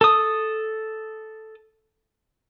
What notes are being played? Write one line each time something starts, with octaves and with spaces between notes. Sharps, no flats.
A4 D#6